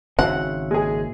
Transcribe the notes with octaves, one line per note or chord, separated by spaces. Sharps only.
G#1 C#3 C4 F#4 E5 F#5
G#3 A#3 G#4